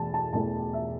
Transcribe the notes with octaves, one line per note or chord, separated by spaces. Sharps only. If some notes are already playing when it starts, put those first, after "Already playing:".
Already playing: E1 E2 E3 A3 A5
A5
E1 E2 E3 A3 A5
E5